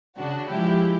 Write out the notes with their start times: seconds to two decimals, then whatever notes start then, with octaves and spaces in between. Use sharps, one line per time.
0.17 C#3 D4 F#4
0.49 F3 G#3 E4 G4